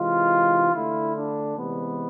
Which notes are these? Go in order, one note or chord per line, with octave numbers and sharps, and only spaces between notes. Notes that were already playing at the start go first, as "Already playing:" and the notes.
Already playing: C3 E3 G#3 F4
D3 A3 E4
D4
C3 E3 G#3 B3